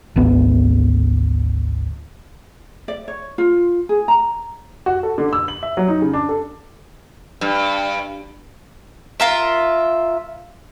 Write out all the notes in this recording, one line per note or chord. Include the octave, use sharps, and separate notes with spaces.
G#1 D2 B3
D5
C#5
F4
G#4
A#5
F#4
A4
D3
E6
F#7
E5
F#3
D#4
C#3
D4
A4
G2
F4 A#4 E5